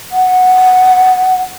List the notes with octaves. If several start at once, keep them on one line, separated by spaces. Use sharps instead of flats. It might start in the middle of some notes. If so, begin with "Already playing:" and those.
F#5